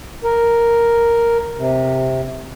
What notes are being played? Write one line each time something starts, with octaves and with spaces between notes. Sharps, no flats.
A#4
C3